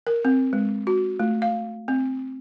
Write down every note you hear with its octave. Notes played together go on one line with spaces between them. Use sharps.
A#4
C4
G#3
F#4
A3
F5
C4